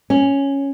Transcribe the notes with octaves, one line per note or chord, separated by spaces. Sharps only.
C#4